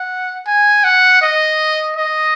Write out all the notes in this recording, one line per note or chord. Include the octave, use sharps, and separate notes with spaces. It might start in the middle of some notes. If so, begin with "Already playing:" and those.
Already playing: F#5
G#5
F#5
D#5
D#5